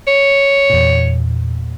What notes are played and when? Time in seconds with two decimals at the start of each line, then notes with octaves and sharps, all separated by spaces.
0.07 C#5
0.70 E2 A#2